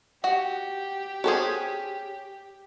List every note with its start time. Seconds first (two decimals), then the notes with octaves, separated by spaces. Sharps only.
0.24 F#4 G4 F#5
1.24 C#4 F#4 G#4 A4 C5